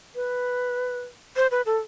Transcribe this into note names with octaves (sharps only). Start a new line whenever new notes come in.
B4
C5
B4
A4